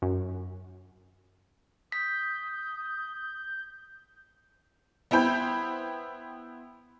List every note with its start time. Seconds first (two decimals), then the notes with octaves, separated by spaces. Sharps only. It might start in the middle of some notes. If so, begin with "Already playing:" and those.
0.02 F#2
1.92 D#6 G6 B6
5.11 B3 E4 C5 G5 B5 G6